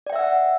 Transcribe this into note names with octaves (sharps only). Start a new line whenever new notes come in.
D5 E5 F#5 G5 E6